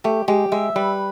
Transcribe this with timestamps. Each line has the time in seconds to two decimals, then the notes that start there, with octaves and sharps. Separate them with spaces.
0.04 A3 G4
0.28 G#3 G4
0.52 G#3 E5
0.76 G3 B4